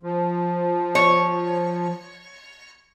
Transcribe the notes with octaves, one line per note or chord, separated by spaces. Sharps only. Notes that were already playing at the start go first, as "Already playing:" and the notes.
F3
C#5